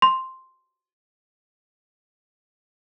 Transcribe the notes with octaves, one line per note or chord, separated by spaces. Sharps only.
C6